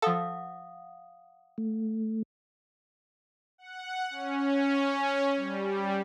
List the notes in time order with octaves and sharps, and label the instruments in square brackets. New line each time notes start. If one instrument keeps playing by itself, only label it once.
[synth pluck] F3 A4 [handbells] F5 F#5 D#6
[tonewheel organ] A3
[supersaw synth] F#5
C#4
G3